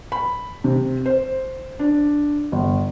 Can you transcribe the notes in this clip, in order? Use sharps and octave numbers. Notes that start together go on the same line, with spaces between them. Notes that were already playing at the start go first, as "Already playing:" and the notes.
B5
C3
C5
D4
G1